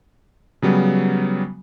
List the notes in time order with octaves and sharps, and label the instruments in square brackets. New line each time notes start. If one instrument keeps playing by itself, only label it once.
[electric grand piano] C#3 F#3 G3 B3